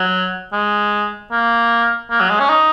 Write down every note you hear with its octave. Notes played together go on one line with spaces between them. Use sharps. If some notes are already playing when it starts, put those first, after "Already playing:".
Already playing: F#3
G#3
A#3
A#3
F#3
G#3
C#4
D#4